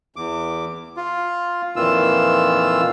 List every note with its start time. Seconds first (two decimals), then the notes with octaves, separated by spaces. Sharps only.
0.16 E2 D6
0.97 F4
1.76 F2 A#2 D#3 E3 F4 E6